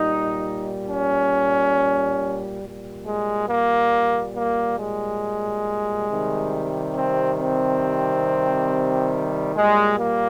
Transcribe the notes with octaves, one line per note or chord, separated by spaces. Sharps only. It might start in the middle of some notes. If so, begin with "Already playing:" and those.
Already playing: A#2 G3 D#4
C#4
A#2 G3
G#3
A#3
A#3
G#3
C3 D#3 G3
C4
C4
A#2 G3 G#3
A#3